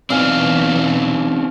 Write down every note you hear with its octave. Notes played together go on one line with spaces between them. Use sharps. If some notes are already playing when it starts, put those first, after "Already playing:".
B2 E3 F#3 C4 D4 D#4 F5 G#5